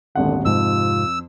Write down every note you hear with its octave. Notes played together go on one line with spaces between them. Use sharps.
D#1 G#1 D3 F#5
F2 G#2 C3 F4 E6